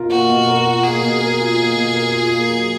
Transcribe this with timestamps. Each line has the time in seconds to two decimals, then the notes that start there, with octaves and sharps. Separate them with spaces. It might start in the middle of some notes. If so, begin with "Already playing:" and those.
Already playing: B2 A#3 F4 A#4
0.10 A#3 F#4
0.29 B2
0.47 A#4
0.65 F4
0.83 A#3 G#4
1.02 B2
1.21 A#4
1.39 F4
1.57 A#3
1.76 B2
1.94 A#4
2.13 F4
2.31 A#3
2.49 F#3